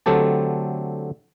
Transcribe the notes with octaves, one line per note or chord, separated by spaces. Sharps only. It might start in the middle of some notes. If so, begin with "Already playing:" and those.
D3 F#3 A3 C4 G4 A5